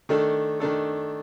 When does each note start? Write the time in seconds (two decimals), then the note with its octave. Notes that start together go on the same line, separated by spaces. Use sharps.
0.09 D#3 A3 D4 A4
0.60 D#3 A3 D4 A4